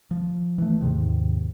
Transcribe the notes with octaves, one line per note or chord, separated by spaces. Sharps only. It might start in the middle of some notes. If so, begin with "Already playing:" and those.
F3
E3 A3
D#2 G#2 C3 D#3